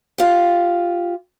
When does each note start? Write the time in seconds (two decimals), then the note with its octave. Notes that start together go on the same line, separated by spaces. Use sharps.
0.18 F4 G4